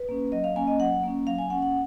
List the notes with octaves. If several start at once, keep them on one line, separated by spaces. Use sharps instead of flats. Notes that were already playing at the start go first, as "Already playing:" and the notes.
Already playing: B4
A#3 C#4
F#3 D#5
F5
A#3 C#4 G#5
D#5
F#3 F#5
A#3 C#4
F#3 F5
G#5
A#3 C#4 F#5
F#5